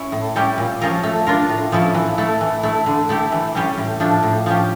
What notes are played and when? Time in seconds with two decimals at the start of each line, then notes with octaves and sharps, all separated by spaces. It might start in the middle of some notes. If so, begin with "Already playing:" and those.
Already playing: C#4 E4
0.12 A2
0.36 G3 C#4 E4 G4
0.58 A#2
0.81 F3 C#4 F4 A#4
1.03 A3
1.26 D4 F4 A#4
1.49 A2
1.72 F3 C#4 E4 A4
1.94 E3
2.18 A3 E4 A4
2.41 E3
2.63 A3 E4
2.86 D3
3.09 A3 E4 G4
3.32 E3
3.55 G3 C#4 G4
3.77 A2
4.00 F3 A3 D4
4.23 A2
4.46 F3 C#4 G4